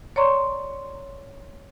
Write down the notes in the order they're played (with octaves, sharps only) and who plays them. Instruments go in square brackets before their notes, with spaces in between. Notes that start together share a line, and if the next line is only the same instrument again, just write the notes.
[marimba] C#5 D5 A#5 C6 C#6